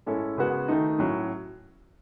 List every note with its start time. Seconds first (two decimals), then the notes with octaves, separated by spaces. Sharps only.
0.06 A2 G#3 C#4 E4 A4
0.38 C#3 G#3 B3 F#4
0.68 D#3 A3 D#4
0.99 A2 F#3 C#4